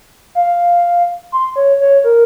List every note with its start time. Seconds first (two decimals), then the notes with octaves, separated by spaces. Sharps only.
0.35 F5
1.32 C6
1.56 C#5
1.80 C#5
2.04 A#4